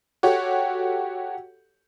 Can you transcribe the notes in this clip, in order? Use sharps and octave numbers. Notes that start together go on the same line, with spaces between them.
F#4 G4 A4 C#5